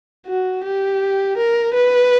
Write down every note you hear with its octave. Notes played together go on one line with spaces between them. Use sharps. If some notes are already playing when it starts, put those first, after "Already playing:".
F#4
G4
A#4
B4